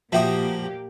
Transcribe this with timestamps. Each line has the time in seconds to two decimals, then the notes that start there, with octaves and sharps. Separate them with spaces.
0.12 A#2 F3 A#3 F#4 G4 E5 G5 D#6